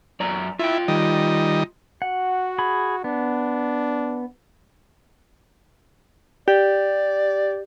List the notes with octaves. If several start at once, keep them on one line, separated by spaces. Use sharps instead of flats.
F#2 D5 A#5
E4 F4 G5
D#3 G3 D#5
F#4 F#5
G#4 B5
B3 D4
G4 D5